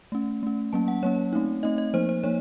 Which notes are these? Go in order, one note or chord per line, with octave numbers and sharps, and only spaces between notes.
A3 C#4
A3 C#4
F#3 A#3 C#4 A5
F#5
F#3 A#3 C#4 C#5
A3 C4 D#4
A3 C4 D#4 D#5
D#5
F3 A#3 D#4 C5
C5
F3 A#3 D#4 C#5